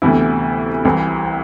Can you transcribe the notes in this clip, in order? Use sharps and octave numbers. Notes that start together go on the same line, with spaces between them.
D2 C3 E3 B3 E4
C2 C3 E3